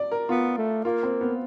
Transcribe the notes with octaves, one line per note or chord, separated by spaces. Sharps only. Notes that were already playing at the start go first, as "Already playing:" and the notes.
Already playing: D5
A#4
B3 F4
A3
A#3 F4
C4
B3